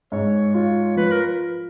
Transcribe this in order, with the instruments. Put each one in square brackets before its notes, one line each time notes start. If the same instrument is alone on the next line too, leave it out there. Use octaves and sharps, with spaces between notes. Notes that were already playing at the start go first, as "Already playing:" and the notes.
[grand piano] G#2 [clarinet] C#5
[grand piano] F4 [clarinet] C#5
[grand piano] F3 [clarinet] B4
[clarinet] A#4